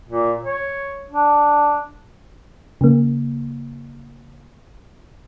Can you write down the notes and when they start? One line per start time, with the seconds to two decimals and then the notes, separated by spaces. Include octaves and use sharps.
0.08 A#2
0.43 C#5
1.11 D4
2.81 C#3 A#3